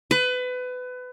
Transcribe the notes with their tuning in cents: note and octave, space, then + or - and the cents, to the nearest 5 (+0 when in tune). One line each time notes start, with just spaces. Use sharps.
B4 +25